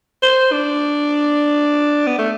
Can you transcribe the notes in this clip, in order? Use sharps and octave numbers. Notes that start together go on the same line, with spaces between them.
C5
D4
B3
A3